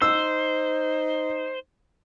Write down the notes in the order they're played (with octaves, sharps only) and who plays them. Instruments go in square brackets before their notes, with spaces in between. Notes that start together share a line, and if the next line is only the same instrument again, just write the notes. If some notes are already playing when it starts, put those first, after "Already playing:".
[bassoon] D#4 [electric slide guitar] C5 [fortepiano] E6